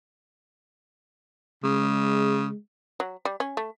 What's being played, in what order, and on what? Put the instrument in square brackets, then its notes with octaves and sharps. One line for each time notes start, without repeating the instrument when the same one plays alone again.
[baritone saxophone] C#3 [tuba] G#3
[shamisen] F#3
G3
C#4
A3